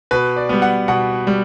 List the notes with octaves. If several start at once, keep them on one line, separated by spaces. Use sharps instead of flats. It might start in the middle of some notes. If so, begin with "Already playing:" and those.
B2 B4
D5
G3 B3
F#5
B2 F#5
G3